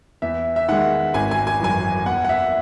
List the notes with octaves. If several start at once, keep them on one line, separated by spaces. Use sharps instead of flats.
E2 E5
E5
D#3 G#3 F#5
G#1 G#5
G#5
G#5
F#2 E3 G#5
E2 F#5
F#5
E5